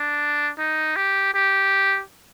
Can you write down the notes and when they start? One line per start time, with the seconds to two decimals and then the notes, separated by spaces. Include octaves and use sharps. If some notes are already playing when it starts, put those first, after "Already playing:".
Already playing: D4
0.59 D#4
0.96 G4
1.34 G4